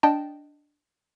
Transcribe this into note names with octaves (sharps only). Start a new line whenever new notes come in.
D4 D#5 G5 A5